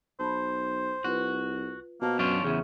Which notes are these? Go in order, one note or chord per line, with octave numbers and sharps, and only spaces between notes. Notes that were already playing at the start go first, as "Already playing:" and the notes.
B1 C5 A5 B5
C2 F4 F#4 B4
B2 A#3 C5 A5
F#2 C#4 D4 F4 C6
E2 C#3 G#4 E5